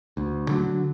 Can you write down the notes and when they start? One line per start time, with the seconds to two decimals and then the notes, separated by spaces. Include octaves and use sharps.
0.17 D2
0.49 D3 F#3